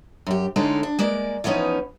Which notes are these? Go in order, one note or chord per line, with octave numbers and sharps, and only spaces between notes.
F#2 G4
D3 G#3 A3 C#4 D#4 E4
D4
G#3 A#3 D5
E3 F3 B3 C#4 D#4